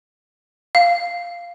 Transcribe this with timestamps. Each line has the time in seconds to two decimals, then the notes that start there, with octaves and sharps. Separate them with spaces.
0.75 F5